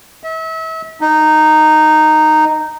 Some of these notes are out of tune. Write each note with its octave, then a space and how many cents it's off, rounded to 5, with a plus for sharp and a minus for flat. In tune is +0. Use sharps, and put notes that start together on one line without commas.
E5 -35
D#4 -10